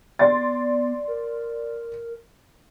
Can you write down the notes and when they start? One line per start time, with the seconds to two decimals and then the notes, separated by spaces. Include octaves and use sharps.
0.19 B3 D5 C6 A6
1.08 A#4